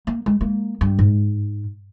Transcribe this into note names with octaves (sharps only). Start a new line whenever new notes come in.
A#3
G#3
A#3
G2
G#2